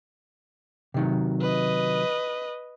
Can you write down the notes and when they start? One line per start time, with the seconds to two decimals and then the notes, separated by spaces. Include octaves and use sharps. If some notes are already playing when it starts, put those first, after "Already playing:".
0.94 C3 D#3 F#3
1.41 B4 D#5